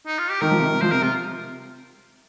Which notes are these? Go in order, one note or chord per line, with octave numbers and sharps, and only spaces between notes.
D#4
F4
G4
D#3 A#4
F3
C3
D#3
C3
F3 C5
C3 A#4
C3 F4